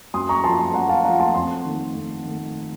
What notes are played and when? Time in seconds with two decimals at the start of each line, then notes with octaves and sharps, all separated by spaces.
0.14 F#2 C6 D#6
0.29 A#5 C#6
0.44 F3 A3 A5 C6
0.59 A5 C6
0.74 F#2 F#5 A#5
0.89 F5 A5
1.04 A3 F#5 A#5
1.08 F3
1.19 A5 C6
1.34 F2 A5 C6
1.65 D#3 A3
1.95 F2
2.25 D#3 A3